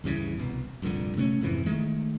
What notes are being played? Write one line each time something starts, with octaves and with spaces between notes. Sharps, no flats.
D2 G2 C#3 E3
C2 B2
F1 A#1 G2 D3
C3 A3 A#3 C#4
F2 G#2 C3 E3
D#3 G#3 A3